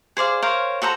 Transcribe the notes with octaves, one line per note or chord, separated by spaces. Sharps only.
G#4 C5 D5 F5
A#4 C5 C#5 F5
F#4 A4 C5 A#5